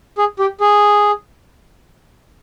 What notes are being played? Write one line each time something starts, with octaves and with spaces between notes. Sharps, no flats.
G#4
G4
G#4